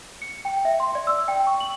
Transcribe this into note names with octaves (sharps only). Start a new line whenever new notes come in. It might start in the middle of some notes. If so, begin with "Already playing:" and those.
C#7
G5
E5
C6
D5
E6
G5
C#6
F#7